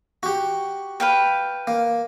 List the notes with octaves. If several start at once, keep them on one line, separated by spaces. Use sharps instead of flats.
F#4 G4
B4 F5 G5
A#3